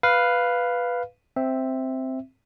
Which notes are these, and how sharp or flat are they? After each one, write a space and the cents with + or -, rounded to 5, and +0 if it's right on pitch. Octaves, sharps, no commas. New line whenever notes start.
B4 +0 F5 +0
C4 +0 E5 +0